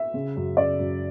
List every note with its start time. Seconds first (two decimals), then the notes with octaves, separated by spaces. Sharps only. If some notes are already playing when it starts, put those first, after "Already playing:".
Already playing: E5
0.14 C#3
0.36 F#2
0.57 C#3 D5
0.80 F#2